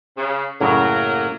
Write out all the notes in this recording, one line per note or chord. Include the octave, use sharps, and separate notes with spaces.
C#3
F#2 A2 C#3 F#3 A#3 A#4